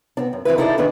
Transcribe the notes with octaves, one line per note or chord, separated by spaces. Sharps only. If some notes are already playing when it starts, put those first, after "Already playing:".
B3 C4 D4
F#2
E3 C4 E4 B4
D#4 E4 G#4 A4 C#5 D5
D2 D#3 D4 G#4 B4